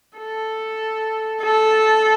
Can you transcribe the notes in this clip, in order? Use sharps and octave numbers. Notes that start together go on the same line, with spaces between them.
A4
A4